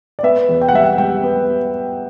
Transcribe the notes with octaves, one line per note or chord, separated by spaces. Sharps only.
D5
B3 E5
E2
G5
F#5
G3 E5
F#5
G3 G5
B3